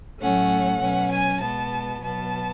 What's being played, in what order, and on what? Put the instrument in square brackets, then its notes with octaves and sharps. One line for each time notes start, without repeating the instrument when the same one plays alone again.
[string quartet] A2 F#3 A3 C#4 F#5
B2 F#3 C#4
G#5
B2 G#3 B3 A5
B2 F#3 B3 A5